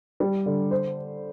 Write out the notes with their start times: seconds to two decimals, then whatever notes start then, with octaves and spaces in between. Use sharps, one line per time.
0.20 G3
0.46 D3
0.71 C5